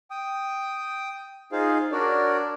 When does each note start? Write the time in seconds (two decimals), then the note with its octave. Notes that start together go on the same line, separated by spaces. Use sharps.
0.11 G5 D#6
1.52 D#4 F4 G#4 C5 F5
1.92 D4 F#4 A#4 C#5 D5